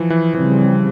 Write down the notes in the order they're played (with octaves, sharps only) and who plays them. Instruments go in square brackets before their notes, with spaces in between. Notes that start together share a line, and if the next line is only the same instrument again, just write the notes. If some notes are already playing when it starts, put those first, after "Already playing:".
Already playing: [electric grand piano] E3 F3
E3
[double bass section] C#3 G3 C4 [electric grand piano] E3